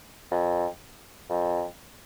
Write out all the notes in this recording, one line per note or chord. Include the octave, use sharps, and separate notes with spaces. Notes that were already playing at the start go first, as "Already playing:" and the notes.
F2
F2